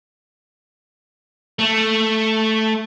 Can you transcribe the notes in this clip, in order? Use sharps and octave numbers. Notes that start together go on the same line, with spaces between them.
A3